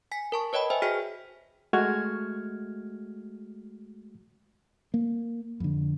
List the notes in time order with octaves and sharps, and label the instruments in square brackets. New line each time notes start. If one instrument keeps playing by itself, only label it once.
[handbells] G#5 B6
A#4 A5 C#6
B4 C#5 D#5 G5 B5
B4 C5 E5 G5 G#5
F#4 G#4 G5 F6 B6
[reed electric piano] G#3 A3 F#4 F6 G#6
[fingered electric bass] A#3
F2 D3